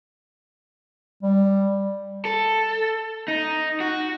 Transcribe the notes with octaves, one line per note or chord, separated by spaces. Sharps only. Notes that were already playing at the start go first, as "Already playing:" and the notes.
G3
A4
D#4
F#4